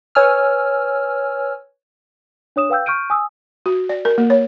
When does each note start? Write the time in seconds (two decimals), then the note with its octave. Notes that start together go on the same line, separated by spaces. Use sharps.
0.15 B4 C#5 G#5 E6 F6
2.56 D4 C#5 D#6 E7
2.70 B4 F5 G5 E6 G6
2.86 C#6 F6 G6 D7 D#7
3.10 G#5 D#6 E6
3.66 F#4
3.89 D5
4.05 A#4
4.18 A#3
4.30 C#5